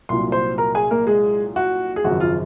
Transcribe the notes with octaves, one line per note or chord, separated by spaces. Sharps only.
C2 A#2 F#3 C6
C5 C6
A#4 A#5
G#4 G#5
A#3 A#4
G#3 G#4
F#4
G#4
G#1 F#2 C#3 F3 F#4
F4